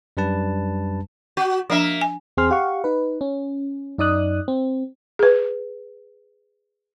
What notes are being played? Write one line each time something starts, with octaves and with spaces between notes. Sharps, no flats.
F#2 G3 D4 B4 A5
F#4
F3 A#3 D4 E5
G#5
E2 C4 G#4 C6 F6
G4 F5 F#5 C#6
D#4 B4
C#4
F#2 D#4 D5 D#6 F#6
C4
G#4 B4